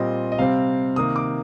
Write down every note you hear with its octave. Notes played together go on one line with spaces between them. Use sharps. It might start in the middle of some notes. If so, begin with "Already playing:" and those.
Already playing: A#2 G3 C4 D#5
D#5
C3 G3 C4 F5
C3 D#3 A#3 D#6
D6